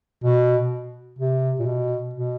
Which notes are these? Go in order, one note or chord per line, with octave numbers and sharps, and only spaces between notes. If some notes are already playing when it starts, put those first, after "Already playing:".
B2
C3
A#2
B2
B2